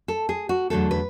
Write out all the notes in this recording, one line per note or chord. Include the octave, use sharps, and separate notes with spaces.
A4
G#4
F#4
E2 D3 F#3 A3 A4
B4